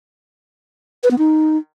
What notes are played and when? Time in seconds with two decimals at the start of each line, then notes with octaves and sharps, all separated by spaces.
1.03 B4
1.11 B3
1.18 D#4